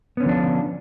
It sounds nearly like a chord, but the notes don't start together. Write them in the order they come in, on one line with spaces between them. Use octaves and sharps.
B3 C#4 D3 F3 D4